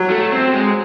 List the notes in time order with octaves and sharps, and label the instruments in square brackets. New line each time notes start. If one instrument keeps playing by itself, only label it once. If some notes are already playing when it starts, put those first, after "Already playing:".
Already playing: [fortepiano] F#3
[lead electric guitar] A3
C4
G#3